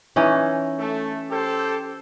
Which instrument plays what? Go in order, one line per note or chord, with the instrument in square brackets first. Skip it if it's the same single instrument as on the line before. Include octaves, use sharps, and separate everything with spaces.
[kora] E3 C#4 D#4
[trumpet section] A3
G4 A4 C5